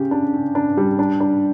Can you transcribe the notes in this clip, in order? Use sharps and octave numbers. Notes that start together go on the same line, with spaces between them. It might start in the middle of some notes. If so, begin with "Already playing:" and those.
Already playing: C#3 G4
D4
C#3
D4
G3
D4
D4